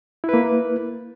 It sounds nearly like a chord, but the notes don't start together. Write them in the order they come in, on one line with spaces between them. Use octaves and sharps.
E4 B4 A#3